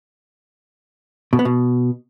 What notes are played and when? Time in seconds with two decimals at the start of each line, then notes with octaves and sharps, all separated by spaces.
1.33 B2
1.39 B3
1.45 B2